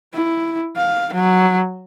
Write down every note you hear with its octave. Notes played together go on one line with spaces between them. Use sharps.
E4
F5
F#3